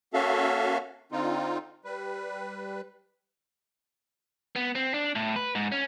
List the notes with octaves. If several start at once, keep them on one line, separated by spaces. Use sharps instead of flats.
A#3 C#4 F#4 A4 E5 F5
D3 C4 D#4 F4
G3 B4
B3
C4
D4
A2
B4
G#2
C#4